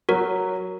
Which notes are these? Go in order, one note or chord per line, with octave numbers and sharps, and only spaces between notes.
F#3 F#4 A#4